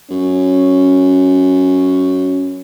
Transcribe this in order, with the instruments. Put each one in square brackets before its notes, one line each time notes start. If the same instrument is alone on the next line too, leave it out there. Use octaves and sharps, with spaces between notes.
[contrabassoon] F#2 [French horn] C#4